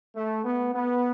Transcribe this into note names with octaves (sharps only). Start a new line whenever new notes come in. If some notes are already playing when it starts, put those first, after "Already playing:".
A3
B3
B3